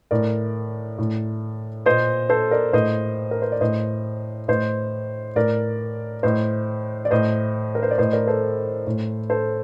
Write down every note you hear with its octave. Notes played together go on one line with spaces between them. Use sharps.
A2 A#4 D5
A2
A#2 C5 D#5
A4 C5
A#4 D5
A2 C5 D#5
A#4
C5
D5
A2 C5 D#5
A2 C5 D#5
A2 A#4 D5
A2 C5 D#5
D5
A2 C5 D#5
A#4
C5
D5
A2 C5 D#5
A#4 D5
A4 C5
A2
A4 C5